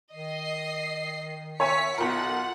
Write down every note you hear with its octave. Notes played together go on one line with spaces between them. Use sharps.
D#3 D#5 C7
C#5 E5 G#5 B6 C#7
B1 F4 A#4 F#5